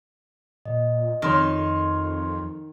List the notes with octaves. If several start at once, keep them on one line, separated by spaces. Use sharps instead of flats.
A#2 D#5
F2 D#3 C#5 C6 F6